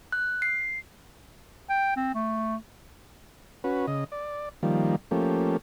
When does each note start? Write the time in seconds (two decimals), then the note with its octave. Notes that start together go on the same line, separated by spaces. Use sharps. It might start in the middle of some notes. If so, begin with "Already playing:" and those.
0.12 F#6
0.42 C7
1.70 G5
1.96 C4
2.15 A3
3.64 C#4 F#4 B4
3.87 C#3 D#5
4.12 D5
4.63 D#3 F3 G3 A#3
5.11 F3 A3 A#3 C#4 G4